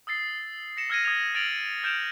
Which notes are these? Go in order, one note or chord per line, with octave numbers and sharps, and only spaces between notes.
D#6 E6 A6 C7
A#6 C#7 E7
E6 F6 G#6 A#6 D#7
D#6 G#6 F7
F6 A6 D7 F7 F#7
F6 G6 D7 E7 F7